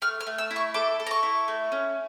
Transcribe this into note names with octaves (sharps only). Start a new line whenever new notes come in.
A3 F6
F6
A3
E6
E4
C#6
A4 D6
A4
A#5
C#6
E4
A3
C#4